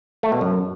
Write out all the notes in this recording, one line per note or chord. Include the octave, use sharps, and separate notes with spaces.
A3
B2
F#2